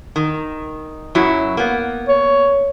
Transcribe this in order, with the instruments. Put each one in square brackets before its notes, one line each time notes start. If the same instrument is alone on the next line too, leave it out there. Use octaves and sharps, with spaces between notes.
[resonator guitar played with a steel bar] D#3
F#2 F#3 E4
A#3 B3
[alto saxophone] C#5